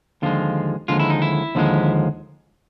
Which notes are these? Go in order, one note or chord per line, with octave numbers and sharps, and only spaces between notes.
D#2 D3 F3 G#3 F4
D#2 D3 F3 G#3 F4
E4
D#4
E4
D#2 D3 F3 G#3